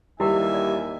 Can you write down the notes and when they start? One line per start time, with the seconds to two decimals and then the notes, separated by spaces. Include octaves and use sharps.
0.20 D#2 E3 G3 E4 G4 B4 E5 G#5
0.54 D5